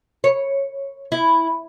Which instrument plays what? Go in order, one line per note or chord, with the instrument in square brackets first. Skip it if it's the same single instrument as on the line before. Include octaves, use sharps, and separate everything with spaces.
[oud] C#5
E4